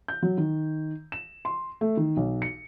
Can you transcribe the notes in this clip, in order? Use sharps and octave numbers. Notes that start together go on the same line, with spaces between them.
G6
F#3
D#3
E7
C6
A3
D#3
B1
C#7